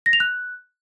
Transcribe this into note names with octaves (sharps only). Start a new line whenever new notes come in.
A#6
F7
F#6